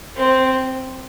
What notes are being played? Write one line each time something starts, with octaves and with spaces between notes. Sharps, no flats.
C4